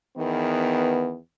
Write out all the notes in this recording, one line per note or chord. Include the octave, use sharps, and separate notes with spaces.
E2 D#3 B3